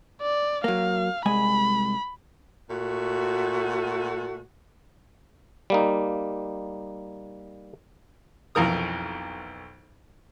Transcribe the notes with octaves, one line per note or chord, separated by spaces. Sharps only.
D5
F#3 A#3 F5
C2 G#3 G#5 B5
A#2 A3 F#4
G3 A#3 D#4
B1 F2 E3 A#4 D#6